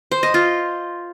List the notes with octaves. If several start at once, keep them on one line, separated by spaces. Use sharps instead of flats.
C5
D#5
F4